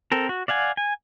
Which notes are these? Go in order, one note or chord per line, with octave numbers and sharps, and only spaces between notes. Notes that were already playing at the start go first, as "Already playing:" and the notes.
C4 A4 A#4
F#4
D5 F5 F#5 G#5
G#5